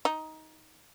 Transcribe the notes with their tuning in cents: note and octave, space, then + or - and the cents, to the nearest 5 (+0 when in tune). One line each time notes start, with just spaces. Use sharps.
D#4 +15